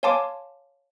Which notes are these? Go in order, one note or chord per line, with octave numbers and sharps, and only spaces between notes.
C#5 F5 G#5 A5 C6 D6